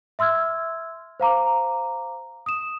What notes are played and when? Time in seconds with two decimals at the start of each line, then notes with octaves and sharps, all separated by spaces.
0.19 E5 C6 E6 F6 G#6
1.20 C5 F5 A#5 D6
2.46 D#6 E7